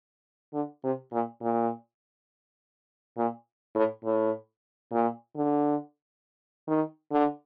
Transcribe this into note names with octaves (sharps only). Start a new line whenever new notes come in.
D3
C3
A#2
A#2
A#2
A2
A2
A#2
D3
D#3
D3